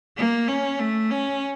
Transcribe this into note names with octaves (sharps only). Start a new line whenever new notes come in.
A#3
C#4
A3
C#4